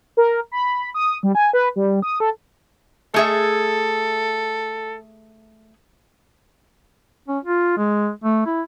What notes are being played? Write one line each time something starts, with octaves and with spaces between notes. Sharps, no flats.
A#4
B5
D#6
G3
G#5
B4
G3
D#6
A4
A3 G#4 A4 E5
C#4
F4
G#3
A3
E4